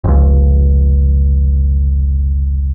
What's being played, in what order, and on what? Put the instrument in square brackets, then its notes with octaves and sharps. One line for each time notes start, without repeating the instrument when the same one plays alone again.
[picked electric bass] F1 C#2